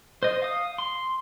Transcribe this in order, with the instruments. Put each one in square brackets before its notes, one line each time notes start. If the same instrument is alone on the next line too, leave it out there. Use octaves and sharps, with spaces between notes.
[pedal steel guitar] C5 D#5
F5 D#6
C6